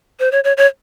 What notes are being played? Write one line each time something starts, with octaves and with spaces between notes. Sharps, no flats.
C5
C#5
C#5
C#5